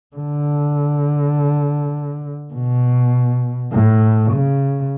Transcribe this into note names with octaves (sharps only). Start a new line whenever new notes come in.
D3
B2
A2
C#3